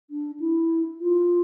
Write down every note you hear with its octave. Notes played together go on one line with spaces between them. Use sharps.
D4
E4
F4